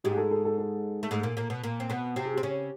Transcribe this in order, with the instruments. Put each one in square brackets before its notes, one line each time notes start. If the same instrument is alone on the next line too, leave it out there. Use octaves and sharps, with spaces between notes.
[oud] G#2 G#3 [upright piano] G4
[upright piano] G#4
A4
A4
A4
A4
[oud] A3
G#2 G#3
A#2 A#3
A#2 A#3
B2 B3
A#2 A#3
C4
B2 B3
[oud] C3 C4 [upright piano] G4
[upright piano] G#4
[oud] C4 [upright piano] G4
[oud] C#3 C#4